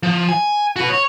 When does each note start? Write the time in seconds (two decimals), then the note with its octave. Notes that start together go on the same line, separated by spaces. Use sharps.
0.03 F3
0.29 G#5
0.76 F#4 B4
0.90 C#5